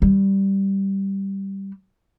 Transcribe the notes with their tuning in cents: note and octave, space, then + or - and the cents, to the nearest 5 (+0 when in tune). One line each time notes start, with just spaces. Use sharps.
G3 -5